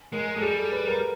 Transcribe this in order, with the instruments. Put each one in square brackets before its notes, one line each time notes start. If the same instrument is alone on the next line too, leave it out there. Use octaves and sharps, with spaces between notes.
[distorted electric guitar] G#3 [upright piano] A#4
[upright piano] A#4
[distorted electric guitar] G#3 [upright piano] A4
[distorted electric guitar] G3 [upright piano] G#4
[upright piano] A4
B4
A#4